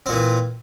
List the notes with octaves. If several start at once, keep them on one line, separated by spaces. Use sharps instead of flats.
A#2 E3 C4